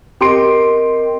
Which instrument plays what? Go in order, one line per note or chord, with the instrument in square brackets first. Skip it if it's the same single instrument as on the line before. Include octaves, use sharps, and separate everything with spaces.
[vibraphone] C4 A#4 D#5 [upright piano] G4 C6 D7